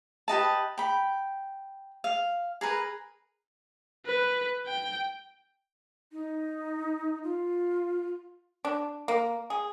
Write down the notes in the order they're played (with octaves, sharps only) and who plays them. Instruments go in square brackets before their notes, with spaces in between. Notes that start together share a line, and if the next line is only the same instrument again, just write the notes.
[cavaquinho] G4 B4 D#5 A5
G5 B5
F5
G#4 A#4 B4
[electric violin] B4
G5
[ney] D#4
F4
[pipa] D4
A#3
G#4